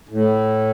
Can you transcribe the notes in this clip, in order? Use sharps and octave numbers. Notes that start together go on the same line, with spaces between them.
A2